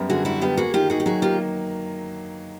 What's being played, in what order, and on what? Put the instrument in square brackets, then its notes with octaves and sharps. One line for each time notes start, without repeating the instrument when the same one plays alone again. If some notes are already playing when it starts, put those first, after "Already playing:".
Already playing: [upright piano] F#2 G3 B3 A#4
[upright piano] D3 [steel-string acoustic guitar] F#4 G#4
[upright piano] G3 [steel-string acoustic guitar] E4 F#4
[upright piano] B3 [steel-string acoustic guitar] F4 G4
[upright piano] A#3 [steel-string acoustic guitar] F#4 G#4
[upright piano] D#3 [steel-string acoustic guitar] F4 G4
[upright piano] D#3 [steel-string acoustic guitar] F#4 G#4
[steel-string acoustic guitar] G4
[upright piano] F#3 [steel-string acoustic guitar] F#4 G#4
[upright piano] A#3 [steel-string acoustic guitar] F4 G4